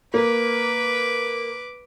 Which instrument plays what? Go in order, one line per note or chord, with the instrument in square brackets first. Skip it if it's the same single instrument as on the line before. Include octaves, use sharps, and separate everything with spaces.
[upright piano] A#3 [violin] B4 D6